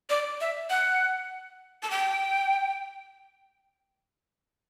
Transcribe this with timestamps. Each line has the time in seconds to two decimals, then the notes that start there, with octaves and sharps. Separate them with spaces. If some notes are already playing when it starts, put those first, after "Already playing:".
0.10 D5
0.41 E5
0.70 F#5
1.83 A5
1.91 G5